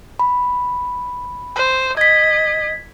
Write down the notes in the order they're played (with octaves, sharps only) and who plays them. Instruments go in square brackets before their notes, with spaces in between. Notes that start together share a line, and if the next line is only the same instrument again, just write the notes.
[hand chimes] B5
[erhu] C5
[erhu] D#5 [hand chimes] G#6 B6